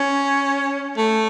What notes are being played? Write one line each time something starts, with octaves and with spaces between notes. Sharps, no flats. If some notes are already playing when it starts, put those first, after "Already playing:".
Already playing: C#4
A3